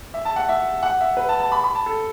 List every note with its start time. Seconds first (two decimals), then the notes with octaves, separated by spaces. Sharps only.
0.14 E5
0.25 A5
0.36 F#5
0.49 E5
0.83 F#5
1.01 E5
1.17 B4
1.29 A5
1.40 A5
1.52 B5
1.64 B5
1.75 A5
1.86 A4